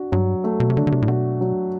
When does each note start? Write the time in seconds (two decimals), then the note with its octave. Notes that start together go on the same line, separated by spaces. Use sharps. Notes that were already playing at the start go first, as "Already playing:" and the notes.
Already playing: D4 F#4
0.12 G2 F#3
0.44 A3
0.60 B2
0.70 C3
0.77 D3 D4
0.87 D3
0.92 C3
1.02 A2
1.08 B2 F#4
1.41 F#3